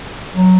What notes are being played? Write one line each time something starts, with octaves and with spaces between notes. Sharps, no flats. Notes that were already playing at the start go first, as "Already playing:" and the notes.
F#3